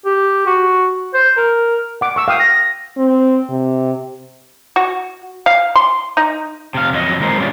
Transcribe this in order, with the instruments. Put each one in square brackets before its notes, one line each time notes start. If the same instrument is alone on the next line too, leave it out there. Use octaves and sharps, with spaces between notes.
[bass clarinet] G4
F#4
C5
A#4
[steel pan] F#5 D6
C#6 E6
F5 G5 D#6
[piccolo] A#6
[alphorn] C4
C3
[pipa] F#4
F5
C6
D#4
[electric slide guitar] C3 F5
F2 F#3 D#5
E3 G#3 C4 A#4 C5
G3 G#3 C#4 F4 D5